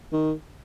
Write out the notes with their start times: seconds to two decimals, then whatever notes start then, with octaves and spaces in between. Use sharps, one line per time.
0.12 D#3